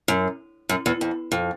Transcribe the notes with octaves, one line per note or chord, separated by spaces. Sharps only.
F#2
F#2
E2
F2
F2